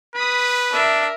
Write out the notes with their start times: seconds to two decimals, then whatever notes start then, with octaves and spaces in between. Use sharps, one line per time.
0.15 B4 B5 D#6
0.73 D4 A#4 E5